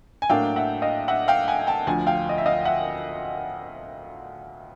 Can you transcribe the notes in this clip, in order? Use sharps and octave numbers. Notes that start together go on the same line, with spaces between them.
G#5
A2 F#3 A#3 D4 F5 G5
E5 F#5
D#5 F5
E5 F#5
F5 G5
F#5 G#5
G#5
G5 A5
D2 D3 F3 F#5 G#5
F5 G5
D#5
E5
D#5 F5
E5 F#5